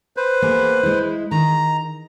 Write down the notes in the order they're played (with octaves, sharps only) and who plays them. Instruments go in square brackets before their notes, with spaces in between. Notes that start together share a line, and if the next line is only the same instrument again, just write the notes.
[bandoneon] B4 C5
[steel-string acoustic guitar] A#3 B3 G#4
G#3 E4
[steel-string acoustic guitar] D#3 [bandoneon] A#5